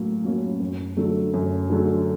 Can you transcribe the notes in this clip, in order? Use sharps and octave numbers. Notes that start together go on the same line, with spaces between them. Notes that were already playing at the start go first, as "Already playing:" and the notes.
Already playing: A2 F#3 A#3 C#4
F#3 A#3 C#4
F#2
D3 F#3 A3
F#2
D3 F#3 A3